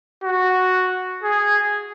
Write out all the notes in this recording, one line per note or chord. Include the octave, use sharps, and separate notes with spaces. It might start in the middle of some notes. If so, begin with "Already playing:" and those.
F#4
G#4